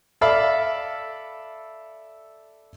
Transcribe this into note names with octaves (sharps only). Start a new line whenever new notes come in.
A4 D5 E5 F5 B5